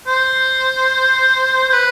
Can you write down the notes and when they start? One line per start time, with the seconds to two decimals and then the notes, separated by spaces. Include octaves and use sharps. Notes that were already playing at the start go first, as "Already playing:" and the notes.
0.07 C5
1.70 C5
1.73 B4